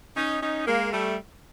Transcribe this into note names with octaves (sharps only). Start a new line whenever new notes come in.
C#4 D#4
C#4 D#4
G#3 A#3
G3 A3